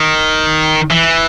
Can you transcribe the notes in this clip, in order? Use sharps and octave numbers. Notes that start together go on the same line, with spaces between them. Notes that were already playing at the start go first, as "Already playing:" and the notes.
Already playing: D#3
E3